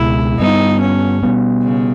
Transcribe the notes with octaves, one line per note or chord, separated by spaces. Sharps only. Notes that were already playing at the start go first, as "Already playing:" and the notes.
Already playing: C#2 B2 G#3 E4
G2 G3 B3 D#4
C#4
B2 G3 B3
C#3